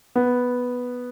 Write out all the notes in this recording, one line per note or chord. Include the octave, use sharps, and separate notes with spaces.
B3